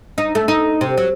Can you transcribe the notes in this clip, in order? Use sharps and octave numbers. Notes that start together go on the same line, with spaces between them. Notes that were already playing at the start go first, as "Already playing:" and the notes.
D#4
A3
D#4
C3
F#3